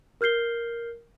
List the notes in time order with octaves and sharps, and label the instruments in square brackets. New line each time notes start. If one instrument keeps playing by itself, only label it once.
[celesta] A#4 F6 G6 C7 G7